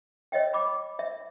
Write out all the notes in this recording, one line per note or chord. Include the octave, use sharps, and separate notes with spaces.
C#5 D#5 E5 G5
B5 D6
E5